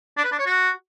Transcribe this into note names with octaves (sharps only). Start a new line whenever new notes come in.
D4
B4
D4
C#5
F#4